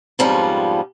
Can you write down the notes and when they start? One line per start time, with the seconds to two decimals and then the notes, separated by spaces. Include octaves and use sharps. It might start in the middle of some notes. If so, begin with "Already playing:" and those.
0.19 F2 G#2 F3 G3 B3 C#4